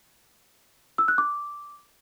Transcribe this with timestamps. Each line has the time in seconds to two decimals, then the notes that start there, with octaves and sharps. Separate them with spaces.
0.98 E6
1.08 F#6
1.18 D6